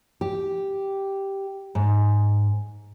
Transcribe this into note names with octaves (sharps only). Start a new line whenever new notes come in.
G4
G#2